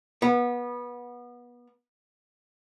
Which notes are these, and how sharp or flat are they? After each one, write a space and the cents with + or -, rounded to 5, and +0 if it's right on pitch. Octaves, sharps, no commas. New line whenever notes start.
B3 -25